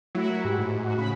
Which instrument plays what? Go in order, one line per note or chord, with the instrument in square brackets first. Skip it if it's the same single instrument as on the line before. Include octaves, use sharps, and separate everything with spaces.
[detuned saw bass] F#3 [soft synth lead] A3 [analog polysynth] E4 F#4
[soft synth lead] A#4
[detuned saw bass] G#2 [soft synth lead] G4
[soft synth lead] A2
[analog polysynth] F#4
[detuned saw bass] C#3 [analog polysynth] B5